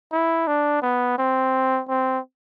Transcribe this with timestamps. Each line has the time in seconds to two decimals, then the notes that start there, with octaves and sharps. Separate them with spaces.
0.12 E4
0.47 D4
0.82 B3
1.18 C4
1.88 C4